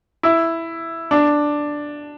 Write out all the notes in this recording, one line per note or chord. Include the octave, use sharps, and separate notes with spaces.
E4
D4